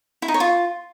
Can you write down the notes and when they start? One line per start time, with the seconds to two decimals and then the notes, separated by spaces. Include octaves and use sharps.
0.22 E4
0.28 D#4
0.34 C#5
0.40 F4